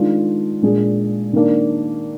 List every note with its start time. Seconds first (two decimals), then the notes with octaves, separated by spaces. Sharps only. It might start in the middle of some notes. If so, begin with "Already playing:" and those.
Already playing: D#3 G#3 D4 F4
0.62 A#2 G#3 D4 G#4
1.33 D#3 A#3 D4